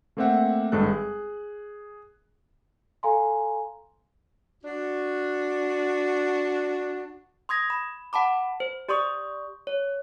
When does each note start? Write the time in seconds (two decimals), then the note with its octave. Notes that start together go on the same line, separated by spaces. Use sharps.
0.17 A3 A#3 C4 C5 E5 F#5
0.72 G#1 G2 G#3 A4 F#6
0.89 G#4
3.03 A4 F5 G#5 A#5 C6
4.64 D4 F#4
7.49 C6 D#6 G#6 A#6
7.70 B5
8.13 F#5 A5 B5 D6
8.60 C5
8.89 G4 D5 C6 C#6 D#6
9.67 C#5